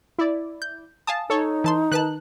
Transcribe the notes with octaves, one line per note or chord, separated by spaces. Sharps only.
E4 D5
G6
F5 G#5 A5 D#6
D#4 A4 C#5
E3 A5 C6
D#3 B4 A5 F#6